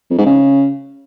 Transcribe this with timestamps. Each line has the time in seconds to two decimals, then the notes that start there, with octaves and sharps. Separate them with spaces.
0.10 F2
0.18 G#2
0.26 C#3